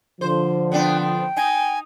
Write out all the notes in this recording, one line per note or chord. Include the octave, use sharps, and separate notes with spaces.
D3 F3 C5
B3 C4 D4 G5
G5
D#4 G#5